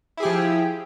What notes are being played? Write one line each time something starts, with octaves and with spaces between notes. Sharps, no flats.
F3 E4 G4 G#4